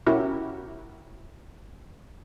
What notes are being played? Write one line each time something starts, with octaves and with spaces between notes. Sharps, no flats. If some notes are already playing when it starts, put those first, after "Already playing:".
B1 C#4 E4 F#4 G4 A#4